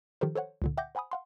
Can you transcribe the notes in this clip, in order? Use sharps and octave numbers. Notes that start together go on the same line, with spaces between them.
D#3 F3 G4 A4 A#4 C5
A4 C5 C#5 F#5
C#2 A#2 D3
E5 F#5 G5 D6 G6 A#6
C5 F#5 G#5 B5 D#6
F5 F#5 C6